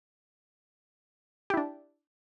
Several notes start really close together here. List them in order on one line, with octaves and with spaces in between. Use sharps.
G4 E4 D4